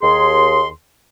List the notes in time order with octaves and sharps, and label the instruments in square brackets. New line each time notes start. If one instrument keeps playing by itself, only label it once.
[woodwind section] D#2 G#4 C6